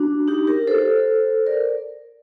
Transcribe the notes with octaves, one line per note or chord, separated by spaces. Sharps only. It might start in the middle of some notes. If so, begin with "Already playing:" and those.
Already playing: D4 F#4
D#4 G4
G4 A#4
A4 C5
A#4 D5